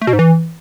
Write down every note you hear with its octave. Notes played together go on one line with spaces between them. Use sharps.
A3
B2
G#2
E3